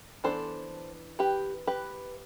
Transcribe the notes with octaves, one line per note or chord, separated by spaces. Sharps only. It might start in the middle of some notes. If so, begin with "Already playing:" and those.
E3 B3 D4 A4 C5
G4 B4
G4 B4